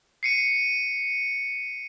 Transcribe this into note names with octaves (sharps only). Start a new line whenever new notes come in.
C7 C#7 D#7